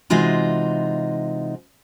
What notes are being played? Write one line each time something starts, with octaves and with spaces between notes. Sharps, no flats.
C3 E3 G#3 D#4 F4 F#4